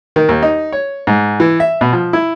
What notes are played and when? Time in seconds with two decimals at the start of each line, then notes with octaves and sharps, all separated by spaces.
0.16 D#3
0.29 D#2
0.43 D#4
0.72 C#5
1.07 G#2
1.40 E3
1.60 E5
1.81 B2
1.93 F3
2.13 E4